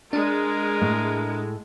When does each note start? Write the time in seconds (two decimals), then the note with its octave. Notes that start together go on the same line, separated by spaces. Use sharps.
0.13 G#3 D4 A#4
0.81 A2 A3